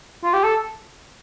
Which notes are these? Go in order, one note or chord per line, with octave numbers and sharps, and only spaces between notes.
F4
G4
A4